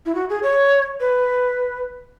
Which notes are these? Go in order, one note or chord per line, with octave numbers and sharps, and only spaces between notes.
E4
F#4
G#4
C#5
B4